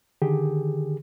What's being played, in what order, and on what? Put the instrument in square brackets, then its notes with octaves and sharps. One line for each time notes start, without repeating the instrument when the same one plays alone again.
[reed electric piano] D3 D#3 G4 G#4